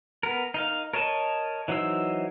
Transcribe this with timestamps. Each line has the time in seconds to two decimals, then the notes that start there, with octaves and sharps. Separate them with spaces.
0.23 B3 A#4
0.54 D#4 A#4 F5
0.93 A#4 C#5 D#5 A5
1.68 E3 F#3 D#4 C5 E6